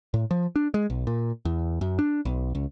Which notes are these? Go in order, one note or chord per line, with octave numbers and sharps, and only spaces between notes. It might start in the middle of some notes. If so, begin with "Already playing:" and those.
A2
F3
D4
G#3
B1
A#2
E2
F#2
D4
B1
C#2